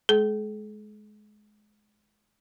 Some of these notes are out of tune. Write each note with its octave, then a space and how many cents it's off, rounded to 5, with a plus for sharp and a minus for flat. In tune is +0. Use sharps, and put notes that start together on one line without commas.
G#3 +20 G#4 +45